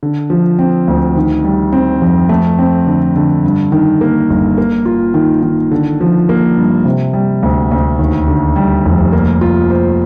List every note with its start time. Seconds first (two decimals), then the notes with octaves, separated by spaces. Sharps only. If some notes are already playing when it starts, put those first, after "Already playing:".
0.03 D3
0.30 F3
0.59 C4
0.88 D2
1.16 D#3
1.44 G3
1.73 C4
2.02 F2
2.29 A3
2.59 C4
2.87 D3
3.16 D3
3.44 G2
3.72 D#3
4.01 A#3
4.30 G1
4.58 A#3
4.86 F4
5.14 D#3
5.42 D#3
5.71 D3
6.01 F3
6.29 A#3
6.57 G2
6.85 C3
7.13 G3
7.43 D2
7.72 D2
7.99 D#2
8.28 D3
8.56 G3
8.85 F1
9.13 A#3
9.41 F4
9.70 C5